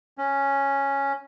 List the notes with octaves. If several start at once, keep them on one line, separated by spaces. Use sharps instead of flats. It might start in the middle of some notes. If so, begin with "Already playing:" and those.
C#4